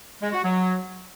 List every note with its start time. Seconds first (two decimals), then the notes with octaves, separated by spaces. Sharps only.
0.21 G#3
0.33 F#4
0.44 F#3